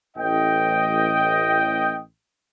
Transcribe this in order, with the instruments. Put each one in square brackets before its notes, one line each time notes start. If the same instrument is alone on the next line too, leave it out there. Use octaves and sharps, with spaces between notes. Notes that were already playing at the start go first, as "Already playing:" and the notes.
[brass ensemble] A1 D#5 G5